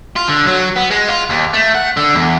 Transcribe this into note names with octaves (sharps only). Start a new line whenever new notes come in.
F4
D3
F#3
B3
G#3
F4
D#2
A3
F#5
D3
E2